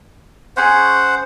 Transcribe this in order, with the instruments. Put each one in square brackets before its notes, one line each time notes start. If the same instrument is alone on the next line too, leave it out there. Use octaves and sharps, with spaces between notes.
[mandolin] C#4 G#4 [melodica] C5 F#5